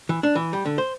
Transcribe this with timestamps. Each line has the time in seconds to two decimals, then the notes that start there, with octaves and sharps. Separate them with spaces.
0.09 E3
0.23 D4
0.35 E3
0.53 G3
0.65 D3
0.78 C5